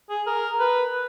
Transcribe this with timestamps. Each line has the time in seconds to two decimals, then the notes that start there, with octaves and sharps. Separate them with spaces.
0.10 G#4
0.26 A#4
0.60 B4